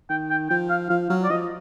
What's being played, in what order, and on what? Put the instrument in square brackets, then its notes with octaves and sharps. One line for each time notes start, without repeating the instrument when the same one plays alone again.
[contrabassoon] D#3 [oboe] G5
[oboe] G5
[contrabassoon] F3 [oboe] G5
[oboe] F5
[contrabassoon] F3 [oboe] F5
[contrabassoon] F#3 [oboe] F5
[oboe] D5
[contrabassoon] F3 [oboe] D#5